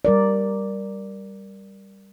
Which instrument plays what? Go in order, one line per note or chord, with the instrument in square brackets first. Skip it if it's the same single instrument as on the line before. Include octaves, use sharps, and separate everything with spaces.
[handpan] G3 A#4 D5